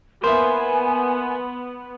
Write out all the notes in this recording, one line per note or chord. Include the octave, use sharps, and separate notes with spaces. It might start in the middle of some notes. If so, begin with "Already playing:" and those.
A#3 B3 E4 C5 G#5